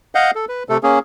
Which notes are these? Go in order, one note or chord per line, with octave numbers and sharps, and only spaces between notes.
D#5 F5 F#5 G6
A4
B4
C3 A3 A4
A#3 C#4 G#4